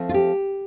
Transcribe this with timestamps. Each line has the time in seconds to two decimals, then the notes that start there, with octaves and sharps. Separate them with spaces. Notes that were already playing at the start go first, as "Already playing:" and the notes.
Already playing: F3 A3 C4
0.09 F4
0.14 G4